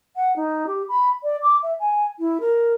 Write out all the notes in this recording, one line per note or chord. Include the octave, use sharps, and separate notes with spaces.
F#5
D#4
G4
B5
D5
D6
E5
G#5
E4
A#4